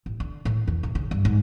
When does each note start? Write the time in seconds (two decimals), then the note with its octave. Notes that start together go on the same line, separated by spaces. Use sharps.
0.06 A1
0.20 D3
0.45 A2
0.67 E2
0.83 C3
0.95 C#3
1.11 G2
1.25 G#2